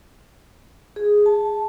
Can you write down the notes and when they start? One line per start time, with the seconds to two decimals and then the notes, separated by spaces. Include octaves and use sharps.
0.96 G#4
1.26 A5